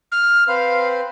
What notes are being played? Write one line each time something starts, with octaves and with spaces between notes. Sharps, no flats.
F6
C4 B4 C5 F5